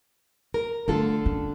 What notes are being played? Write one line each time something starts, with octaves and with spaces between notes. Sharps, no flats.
A#4
D3 A3 B3 F4 A4
C#4